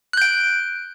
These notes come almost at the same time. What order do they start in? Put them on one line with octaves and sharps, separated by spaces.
F#6 G6 D7